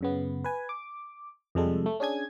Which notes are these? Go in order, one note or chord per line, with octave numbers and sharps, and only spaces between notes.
F#2 C#3 B3
B4 G#5
D6
F2 C3 G3 G#3 A4
A3
C#4 D4 G#4 G#5 G#6